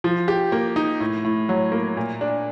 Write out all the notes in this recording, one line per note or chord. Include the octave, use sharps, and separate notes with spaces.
F3
G4
A#3
D#4
A2
A2
F#3
A#3
A#2
D4